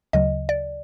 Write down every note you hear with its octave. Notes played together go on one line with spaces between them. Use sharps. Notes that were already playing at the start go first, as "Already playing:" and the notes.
D2 C#3 F#3 D#5
D5